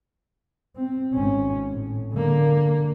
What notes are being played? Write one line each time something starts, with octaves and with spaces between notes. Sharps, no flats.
C4
G#1 C#4
A2
D3 A#3